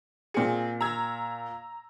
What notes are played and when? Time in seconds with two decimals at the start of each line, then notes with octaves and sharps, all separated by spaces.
0.34 A#2 C4 G#4 C#7
0.81 A#5 E6 G#6